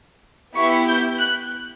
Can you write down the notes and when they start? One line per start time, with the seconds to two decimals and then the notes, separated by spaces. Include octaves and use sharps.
0.55 B3 E4 G4 C#6
0.87 G6
1.20 F#6